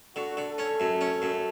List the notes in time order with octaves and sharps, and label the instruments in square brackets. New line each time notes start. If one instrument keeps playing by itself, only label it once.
[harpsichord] D3 [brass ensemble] F#4
[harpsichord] D3
[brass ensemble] A4
[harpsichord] C#4
F#2
C#4
F#2